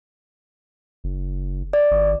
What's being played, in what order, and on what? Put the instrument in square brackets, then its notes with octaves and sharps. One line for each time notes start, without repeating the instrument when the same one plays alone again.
[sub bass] F#1
[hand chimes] D5
[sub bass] G#1